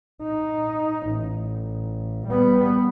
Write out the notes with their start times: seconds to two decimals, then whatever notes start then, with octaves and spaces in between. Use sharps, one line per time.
0.23 D#4
1.08 A1
2.27 G3 B3